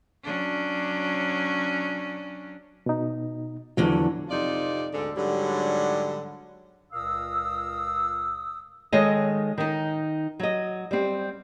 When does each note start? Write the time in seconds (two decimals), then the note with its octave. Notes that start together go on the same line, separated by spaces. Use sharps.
0.23 F#3 C#4 D4
2.86 B2 D#4
3.77 E2 D3 F3 F#3
4.29 F2 C3 D#4 F4 D5
4.93 D2 G#2 D3
5.16 G#2 D3 F#3 G3
6.93 C#2 A#2 A#4 F5 D#6 E6
8.92 D#3 G#3 A4 C#5 D#5
9.58 D#3 D#4
10.40 F#3 D#5
10.91 G3 C4